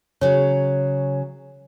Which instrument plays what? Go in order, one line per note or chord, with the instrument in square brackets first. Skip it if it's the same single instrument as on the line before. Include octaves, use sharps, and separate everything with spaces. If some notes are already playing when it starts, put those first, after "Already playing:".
[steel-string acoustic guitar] C#3 F#3 [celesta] C#5